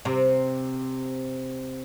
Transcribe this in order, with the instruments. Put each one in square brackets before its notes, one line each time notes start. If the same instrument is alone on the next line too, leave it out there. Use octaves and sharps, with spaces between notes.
[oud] C3